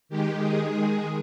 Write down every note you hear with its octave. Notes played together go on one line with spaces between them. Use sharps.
D#3 G#3 G4
G#4